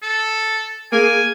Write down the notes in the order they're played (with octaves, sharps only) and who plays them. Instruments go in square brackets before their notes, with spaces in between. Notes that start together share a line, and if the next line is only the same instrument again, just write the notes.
[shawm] A4
[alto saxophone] A#3 [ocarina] G#4 [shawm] G#5